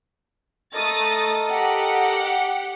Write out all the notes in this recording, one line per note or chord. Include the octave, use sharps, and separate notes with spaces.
A3 A4 A#4 D#5 D#6 A6
G4 F#5 C#7